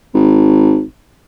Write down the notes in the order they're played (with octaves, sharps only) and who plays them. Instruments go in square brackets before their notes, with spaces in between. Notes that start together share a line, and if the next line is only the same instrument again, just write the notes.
[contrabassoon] G#1